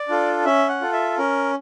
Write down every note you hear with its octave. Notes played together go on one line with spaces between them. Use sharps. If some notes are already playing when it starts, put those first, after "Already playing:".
Already playing: D5
D4 F4 A4
C#4 E5
F#5
F4 A4
E5
C#4 A#4